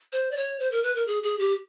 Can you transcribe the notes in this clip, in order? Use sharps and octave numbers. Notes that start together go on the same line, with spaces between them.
C5
D5
C#5
C5
A#4
B4
A#4
G#4
G#4
G4